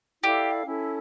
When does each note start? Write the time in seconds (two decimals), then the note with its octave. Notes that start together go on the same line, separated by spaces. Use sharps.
0.23 E4 G4 A4 D5 F5
0.66 C#4 E4 A4